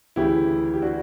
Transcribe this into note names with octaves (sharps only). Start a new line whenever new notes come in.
D2 C#3 E3 E4 G4
G4
D4 F#4